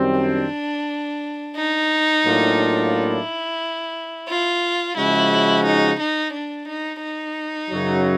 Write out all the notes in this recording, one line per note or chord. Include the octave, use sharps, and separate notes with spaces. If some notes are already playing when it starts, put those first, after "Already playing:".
Already playing: F#2 D#3 G3 C4
D4
D#4
A2 F#3 A#3 D4 F4
E4
F4
C#3 F3 G#3 C#4 E4 F#4
D#4
D#4
D4
D#4
D#4
F#2 C#3 F#3